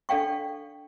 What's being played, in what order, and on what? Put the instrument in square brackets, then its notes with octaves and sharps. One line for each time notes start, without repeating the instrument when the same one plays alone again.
[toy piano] D4 A4 D5 F5 G5 C#6